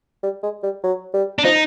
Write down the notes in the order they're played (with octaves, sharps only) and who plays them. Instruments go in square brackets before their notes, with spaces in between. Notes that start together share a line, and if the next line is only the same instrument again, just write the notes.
[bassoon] G3
G#3
G3
F#3
G3
[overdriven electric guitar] D4
[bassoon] F3 [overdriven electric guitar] D#4